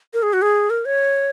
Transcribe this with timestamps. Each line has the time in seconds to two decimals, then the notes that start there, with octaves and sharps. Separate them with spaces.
0.14 A#4
0.23 G#4
0.33 F#4
0.42 G#4
0.70 A#4
0.85 C#5